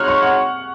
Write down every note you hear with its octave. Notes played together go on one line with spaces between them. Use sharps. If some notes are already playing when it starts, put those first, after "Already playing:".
Already playing: G#3 D#4 F#4 C#5 F6 F#6
C#6
F#5